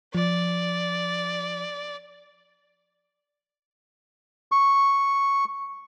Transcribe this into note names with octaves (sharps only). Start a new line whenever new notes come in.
F3 D5
C#6